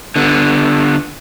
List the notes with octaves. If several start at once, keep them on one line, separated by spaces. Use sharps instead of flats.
D3 B3